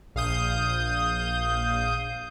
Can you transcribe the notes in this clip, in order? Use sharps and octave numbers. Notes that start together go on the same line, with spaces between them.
A#1 F5 D#6 G6